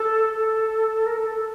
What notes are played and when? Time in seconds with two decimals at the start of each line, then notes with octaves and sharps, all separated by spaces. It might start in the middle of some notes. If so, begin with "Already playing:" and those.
Already playing: A4
0.33 A4
1.06 A#4
1.19 A4
1.31 A4